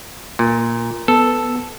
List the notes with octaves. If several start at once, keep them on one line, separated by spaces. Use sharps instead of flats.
A#2
B3 A4